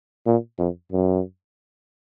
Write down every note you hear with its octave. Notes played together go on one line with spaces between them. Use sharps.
A#2
F2
F#2